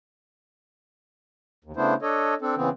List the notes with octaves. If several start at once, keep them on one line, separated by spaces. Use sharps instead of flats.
D#2
C#3 A3 B3 D4 E4 C5
D4 A4 C#5 D#5
C4 D4 A4
C#3 E3 B3 C4